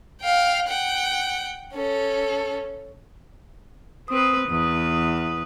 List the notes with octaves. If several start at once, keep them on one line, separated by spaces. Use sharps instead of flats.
F5 G5
F#5 G5
C#4 A4
C4 B4 D#6
E2 B4